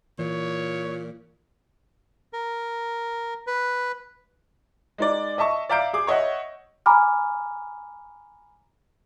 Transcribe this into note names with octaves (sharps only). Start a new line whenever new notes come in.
A#2 E3 C#5
A#4
B4
G#3 D#4 D5
D#5 E5 A5 C#6
D5 E5 F5 A#5 G6 D7
G#4 D6
C#5 D#5 E5 F#5
G#5 A#5 B5 D6 F6